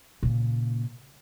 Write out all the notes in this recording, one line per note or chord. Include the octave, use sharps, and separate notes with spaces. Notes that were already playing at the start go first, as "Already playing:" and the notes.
A#2 C#3